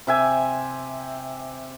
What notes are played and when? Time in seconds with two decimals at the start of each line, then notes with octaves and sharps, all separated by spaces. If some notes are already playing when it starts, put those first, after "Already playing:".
0.07 C3 E5 G#5